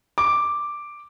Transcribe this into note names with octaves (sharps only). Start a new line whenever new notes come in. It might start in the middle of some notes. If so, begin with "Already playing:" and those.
D6